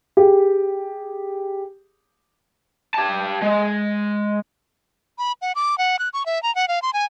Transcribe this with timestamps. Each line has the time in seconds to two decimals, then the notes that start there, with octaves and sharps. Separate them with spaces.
0.17 G4 G#4
2.94 G4 A5
3.42 G#3
5.18 B5
5.42 F#5
5.55 D6
5.78 F#5
5.99 F#6
6.13 C#6
6.26 E5
6.43 A#5
6.55 F#5
6.68 F5
6.82 C6
6.93 G#5